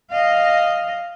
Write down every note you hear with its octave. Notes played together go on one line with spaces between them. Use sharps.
D#5 F5